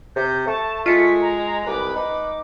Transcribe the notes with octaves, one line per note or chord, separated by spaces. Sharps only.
C3 G6
A3 A5
G#3 F4 B6 C#7
A#5
C2 B4 D6
D#4 D6